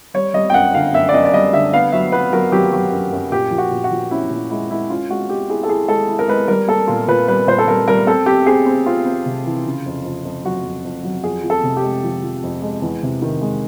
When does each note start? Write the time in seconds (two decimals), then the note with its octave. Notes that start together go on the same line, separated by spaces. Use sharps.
0.14 G3 C#5
0.34 G3 D#5
0.50 G5
0.54 F#2 F#5
0.74 D3 F5
0.94 F#2 E5
1.09 D5
1.14 F#2 D#5
1.25 D5
1.33 G3 D#5
1.53 D3 E5
1.73 B3 F5
1.92 F#3 E5
2.12 B3 B4
2.33 F#3 A#4
2.52 F#3 G4
2.73 F#3
2.92 F#2
3.12 F#2
3.32 A#2 G4
3.51 F3
3.58 F#4
3.71 A#2
3.84 F#4
3.91 F3
4.11 C#4 E4
4.31 A#2
4.50 G#3 E4
4.70 G#3 E4
4.90 C#4 F4
5.10 G#3 F#4
5.29 G#3 G4
5.49 E4 G#4
5.63 A4
5.69 E4 G#4
5.88 G#3 A4
6.08 E4
6.19 A#4
6.28 G#3 B4
6.48 G3 A#4
6.68 A#3 A4
6.88 A#2 F4
7.08 A#2 B4
7.28 G3 B4
7.47 A#2 C5
7.58 A4
7.68 G3 A#4
7.87 G3 A#4
8.07 C4 A4
8.26 C4 G4
8.46 C4 G#4
8.66 C4
8.86 C4 F4
9.06 C4
9.26 C3
9.46 E3
9.66 C#3
9.86 F2
10.05 F2
10.25 F2
10.44 F#3 F#4
10.64 F2
10.84 F2
11.04 F#3
11.24 F2 G#4
11.43 F3
11.50 A4
11.63 C3
11.77 G4
11.84 G#3
12.04 F3
12.22 F3
12.43 F2
12.62 G#3
12.82 E2
13.03 C3
13.22 D#3
13.41 G#3